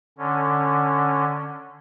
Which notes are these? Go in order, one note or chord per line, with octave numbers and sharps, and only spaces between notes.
D3 C#4